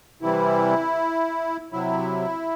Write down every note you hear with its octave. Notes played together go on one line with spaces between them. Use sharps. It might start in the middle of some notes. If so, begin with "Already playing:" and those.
C3 E3 G3 E4
C3 F#3 E4